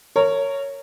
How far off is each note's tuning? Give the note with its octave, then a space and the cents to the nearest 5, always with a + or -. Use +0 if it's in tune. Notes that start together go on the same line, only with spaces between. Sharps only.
A#4 -25 C#5 +0